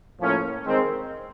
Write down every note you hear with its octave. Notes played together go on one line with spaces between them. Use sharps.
A2 F3 A#3 C#4
D#3 G#3 C4